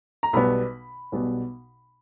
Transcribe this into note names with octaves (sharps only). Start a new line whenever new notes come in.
A#5
B1 B2 G3 B3 B5
B1 B2 G3 B3